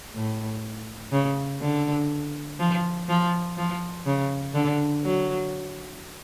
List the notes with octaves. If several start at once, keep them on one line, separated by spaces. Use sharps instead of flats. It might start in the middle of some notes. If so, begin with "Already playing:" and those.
A2
C#3
D3
F3
F3
F3
C#3
D3
F#3